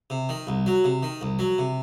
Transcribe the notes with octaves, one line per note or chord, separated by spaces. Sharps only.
C3
D#3
C2
F#3
C3
D#3
C2
F#3
C3